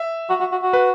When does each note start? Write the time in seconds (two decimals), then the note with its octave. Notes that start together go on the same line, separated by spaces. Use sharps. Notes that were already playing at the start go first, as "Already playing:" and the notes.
Already playing: E5
0.30 F#4
0.40 F#4
0.52 F#4
0.62 F#4
0.73 B4